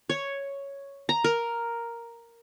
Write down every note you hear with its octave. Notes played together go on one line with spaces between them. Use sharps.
C#5
A#5
A#4